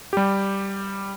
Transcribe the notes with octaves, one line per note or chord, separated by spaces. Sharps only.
G3 G4